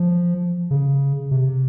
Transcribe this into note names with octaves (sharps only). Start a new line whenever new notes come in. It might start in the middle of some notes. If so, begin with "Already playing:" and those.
Already playing: F3
C#3
C3